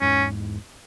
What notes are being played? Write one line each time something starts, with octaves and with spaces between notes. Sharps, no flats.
E2 G#2 C#4